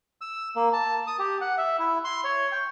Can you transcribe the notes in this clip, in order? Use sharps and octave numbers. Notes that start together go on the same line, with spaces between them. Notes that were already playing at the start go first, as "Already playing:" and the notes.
E6
A#3
A5
D#6
G4
F#5
E5
E4
C6
C#5
G5